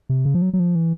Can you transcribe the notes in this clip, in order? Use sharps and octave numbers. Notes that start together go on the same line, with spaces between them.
C3
C#3
F3
F#3
F#3
F3
E3